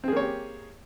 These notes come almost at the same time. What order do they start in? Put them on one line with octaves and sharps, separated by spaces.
C4 G#4 A#3 C#5 G4